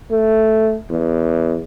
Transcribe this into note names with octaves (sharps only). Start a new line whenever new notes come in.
A3
E2